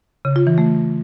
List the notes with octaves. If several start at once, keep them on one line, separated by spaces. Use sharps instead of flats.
C#3
F4
E3
A3